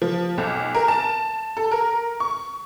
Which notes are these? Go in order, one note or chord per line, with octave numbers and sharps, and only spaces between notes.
F3
B1
A#4
A5
A4
A#4
C#6